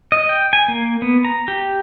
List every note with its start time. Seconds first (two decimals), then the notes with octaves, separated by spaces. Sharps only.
0.12 D#5
0.29 G5
0.53 G#5
0.68 A#3
1.02 B3
1.25 A#5
1.48 G4